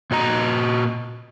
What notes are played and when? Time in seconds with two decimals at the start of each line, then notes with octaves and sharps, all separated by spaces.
0.11 A#2 F#4 D#5 A#5